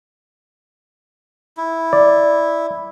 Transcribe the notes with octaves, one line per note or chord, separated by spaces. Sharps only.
E4
D5